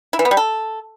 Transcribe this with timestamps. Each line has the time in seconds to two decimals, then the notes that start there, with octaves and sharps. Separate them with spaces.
0.13 E4
0.19 E3
0.25 B3
0.31 G3
0.37 A4